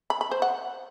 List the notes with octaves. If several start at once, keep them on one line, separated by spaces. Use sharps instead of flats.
B5
B5
C5
F#5